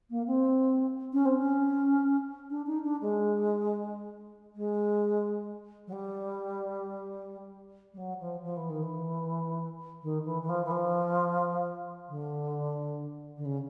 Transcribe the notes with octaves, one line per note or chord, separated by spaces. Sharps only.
A#3
C4
C#4
C4
C#4
D4
D#4
D4
G#3
G#3
F#3
G3
G3
F#3
F3
F3
E3
D#3
E3
D#3
E3
E3
F3
E3
F3
D3
D3
C#3